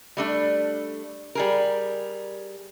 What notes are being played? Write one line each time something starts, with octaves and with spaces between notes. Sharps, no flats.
G3 A3 D4
G3 G#4 A#4